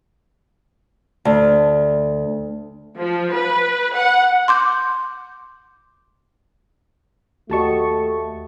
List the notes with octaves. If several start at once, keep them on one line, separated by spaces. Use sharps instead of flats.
D2
F3
B4
F#5
C6 D6 G6
D#2 A3 F#4 G4 D#5 A5 C#6